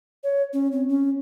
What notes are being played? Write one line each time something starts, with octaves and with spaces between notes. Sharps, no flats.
C#5
C#4
C4
C#4